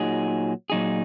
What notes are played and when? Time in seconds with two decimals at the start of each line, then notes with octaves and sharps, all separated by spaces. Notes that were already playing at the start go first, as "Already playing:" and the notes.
Already playing: A#2 F#3 D#4 G#4
0.70 A#2 F#3 D#4 G#4